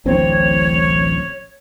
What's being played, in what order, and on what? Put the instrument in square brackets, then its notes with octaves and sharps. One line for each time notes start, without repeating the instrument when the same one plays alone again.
[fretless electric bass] D1 A1 C4 [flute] C#5